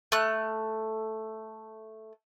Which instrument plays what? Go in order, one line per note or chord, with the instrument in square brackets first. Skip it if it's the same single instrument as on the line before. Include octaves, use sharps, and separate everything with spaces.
[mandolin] A3 F#6